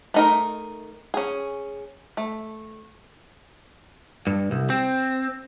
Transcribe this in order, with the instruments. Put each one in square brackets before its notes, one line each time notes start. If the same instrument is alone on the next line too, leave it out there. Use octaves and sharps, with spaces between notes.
[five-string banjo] A3 D#4 A#4
C#4 G#4
A3
[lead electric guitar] G2
C2
C4